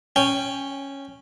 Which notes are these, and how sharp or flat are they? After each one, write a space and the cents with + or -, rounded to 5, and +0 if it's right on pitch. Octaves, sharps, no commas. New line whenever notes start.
C#4 -5 G5 +15